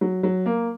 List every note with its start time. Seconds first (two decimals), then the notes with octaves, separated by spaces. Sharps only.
0.01 F#3
0.23 F#3
0.46 A#3